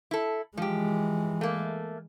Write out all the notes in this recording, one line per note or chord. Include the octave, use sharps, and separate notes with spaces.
E4 A4
E3 F3 G#3 G4
A3 A#3